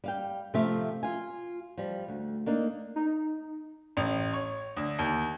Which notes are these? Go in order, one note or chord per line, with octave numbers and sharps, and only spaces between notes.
G3 F5 G5
C3 F3 A3 C4 E5 F5
F4 G#5
F3 G3
D2
A#3 D4 D#4
D#4
A1
C#5
D2
D#2